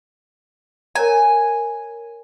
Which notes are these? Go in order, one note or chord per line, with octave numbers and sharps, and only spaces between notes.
A#4 C#5 G#5 A#5